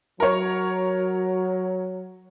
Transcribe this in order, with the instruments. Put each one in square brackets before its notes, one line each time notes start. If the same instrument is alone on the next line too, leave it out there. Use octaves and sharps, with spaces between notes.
[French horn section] F#3 [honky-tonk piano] A#4 C#5